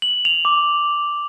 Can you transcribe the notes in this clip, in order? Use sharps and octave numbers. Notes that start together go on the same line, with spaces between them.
F#7
F7
D6